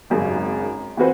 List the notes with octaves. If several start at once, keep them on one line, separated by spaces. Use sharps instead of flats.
G#1 F#2 C#3
E3 C4 F#4 B4 C5